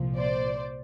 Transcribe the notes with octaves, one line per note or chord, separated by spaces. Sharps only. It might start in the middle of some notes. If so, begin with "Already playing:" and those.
Already playing: C2 A#2 F3
C5 D5